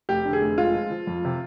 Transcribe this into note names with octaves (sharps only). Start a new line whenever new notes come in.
F1 G4
D3
G#4
F1
G#3 F4
F3
F3
F2
C3